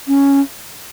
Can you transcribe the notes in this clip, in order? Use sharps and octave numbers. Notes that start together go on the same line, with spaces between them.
C#4